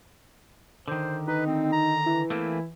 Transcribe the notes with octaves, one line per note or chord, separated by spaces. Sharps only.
D3 D#3 C5
D#4 B4
C4
A#5
E3
A3 A#3 C4 E4